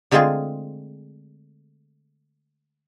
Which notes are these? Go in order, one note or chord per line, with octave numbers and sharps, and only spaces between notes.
D3 G#3 A3 C4 F4 G#4